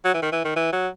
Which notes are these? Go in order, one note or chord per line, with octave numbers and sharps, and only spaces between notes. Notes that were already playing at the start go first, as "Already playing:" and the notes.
F#3
E3
D#3
E3
D#3
E3
F#3